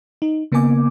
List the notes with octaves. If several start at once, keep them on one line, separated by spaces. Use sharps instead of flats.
D#4
C#3 A#3 B3 A#4 G#5 D6